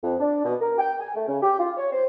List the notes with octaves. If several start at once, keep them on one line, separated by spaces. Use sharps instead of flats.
F2
D4
B2
A#4
G5
G#5
A3
C#3
G4
F4
C#5
C5